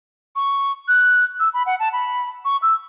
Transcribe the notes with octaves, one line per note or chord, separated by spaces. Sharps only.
C#6
F#6
E6
B5
F#5
A5
B5
C#6
E6